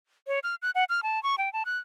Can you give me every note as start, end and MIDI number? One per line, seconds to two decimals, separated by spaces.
0.27 0.39 73
0.44 0.55 89
0.62 0.71 90
0.75 0.84 78
0.89 1.01 89
1.03 1.22 81
1.23 1.36 85
1.38 1.52 79
1.53 1.63 81
1.66 1.78 90